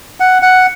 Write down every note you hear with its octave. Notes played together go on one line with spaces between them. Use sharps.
F#5
F#5